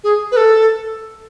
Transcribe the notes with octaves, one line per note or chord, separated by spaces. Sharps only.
G#4
B4
A4